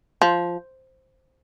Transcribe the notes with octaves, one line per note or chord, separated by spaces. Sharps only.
F3